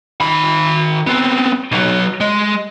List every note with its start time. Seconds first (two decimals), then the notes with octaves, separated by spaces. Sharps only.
0.20 D#3 B5
1.07 B3 C4
1.72 B1 F#3
2.21 G#3